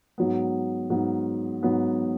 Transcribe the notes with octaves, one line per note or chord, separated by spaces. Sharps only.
G#2 F#3 B3
G#2 F#3 B3
G#2 F#3 B3